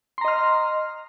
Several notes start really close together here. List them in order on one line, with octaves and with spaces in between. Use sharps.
C6 A#5 D#5 F6